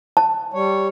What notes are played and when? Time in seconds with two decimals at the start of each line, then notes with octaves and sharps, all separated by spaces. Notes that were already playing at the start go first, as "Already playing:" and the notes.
0.17 A5
0.54 G3 C#5